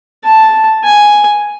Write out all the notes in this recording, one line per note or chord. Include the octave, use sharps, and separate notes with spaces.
A5
G#5